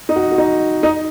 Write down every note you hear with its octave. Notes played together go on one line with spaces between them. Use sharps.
D#4
F#4
F#4
D#4
D#4